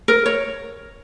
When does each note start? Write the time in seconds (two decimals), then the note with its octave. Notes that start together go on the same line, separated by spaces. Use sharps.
0.08 A#4
0.26 C#5